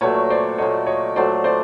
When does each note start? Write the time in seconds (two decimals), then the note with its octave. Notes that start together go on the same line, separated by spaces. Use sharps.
0.01 A#2 F#3 A3 B4 C#5
0.30 C5 D5
0.58 A#2 F#3 A3 C#5 D#5
0.87 C#5 D#5
1.16 A#2 F#3 A3 C5 D5
1.44 C5 D5